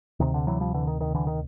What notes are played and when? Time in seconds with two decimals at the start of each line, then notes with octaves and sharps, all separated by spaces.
0.20 D2 C3 D#3
0.34 D3
0.47 E3 F#3
0.60 F3 G3
0.74 D3 E3
0.87 D#3
1.00 D#3
1.14 D3 E3
1.27 D#3